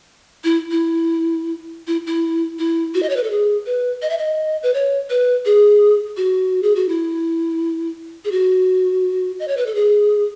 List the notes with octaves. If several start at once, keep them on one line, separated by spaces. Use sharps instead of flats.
E4
E4
E4
E4
E4
F#4
D#5
C#5
B4
A4
G#4
B4
D#5
E5
D#5
B4
C#5
B4
G#4
F#4
G#4
F#4
E4
G#4
F#4
D#5
C#5
B4
A4
G#4